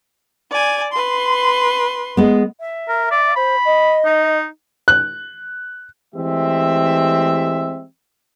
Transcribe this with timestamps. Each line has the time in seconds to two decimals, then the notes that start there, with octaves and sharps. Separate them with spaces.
0.50 D5 G#5
0.93 B4 C6
2.17 G#3 B3
2.60 E5
2.88 A#4
3.11 D5
3.36 C5 B5
3.65 D#5
4.05 D#4
4.88 F#6
6.15 E3 G#3 A3 C4 G4 E5